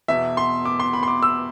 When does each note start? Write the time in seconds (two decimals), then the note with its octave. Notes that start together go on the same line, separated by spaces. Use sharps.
0.08 E2 B2 E5
0.37 C6
0.65 D6
0.80 C6
0.93 B5
1.03 C6
1.08 D6
1.23 E6